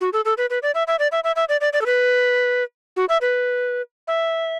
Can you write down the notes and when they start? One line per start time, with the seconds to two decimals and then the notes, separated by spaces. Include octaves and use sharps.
0.01 F#4
0.13 A4
0.25 A4
0.38 B4
0.50 B4
0.63 D5
0.75 E5
0.87 E5
0.99 D5
1.12 E5
1.24 E5
1.36 E5
1.49 D5
1.61 D5
1.73 D5
1.81 A4
1.86 B4
2.96 F#4
3.09 E5
3.21 B4
4.08 E5